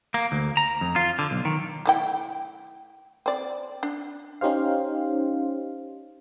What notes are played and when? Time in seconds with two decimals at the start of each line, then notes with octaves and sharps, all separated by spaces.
0.14 A#3
0.32 D2
0.57 A#5
0.81 F2
0.96 F4
1.19 D3
1.31 B1
1.45 D#3
1.86 A3 E4 G5
3.26 C4 D5
3.83 D4
4.41 C#4 D#4 G4 C5 F5